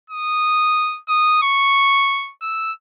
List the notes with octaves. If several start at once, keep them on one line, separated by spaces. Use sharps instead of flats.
D#6
D#6
C#6
E6